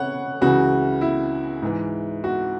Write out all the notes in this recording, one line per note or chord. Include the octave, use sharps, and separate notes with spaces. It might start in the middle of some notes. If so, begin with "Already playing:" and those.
Already playing: C#3 C#5 F#5
C#2 C#3 E3 F#4
E4
G#2 E3
F#4